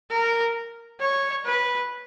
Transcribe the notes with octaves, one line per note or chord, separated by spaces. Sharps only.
A#4
C#5
B4